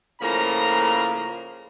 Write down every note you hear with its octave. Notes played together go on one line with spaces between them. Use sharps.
A2 C#3 F3 A#3 A#5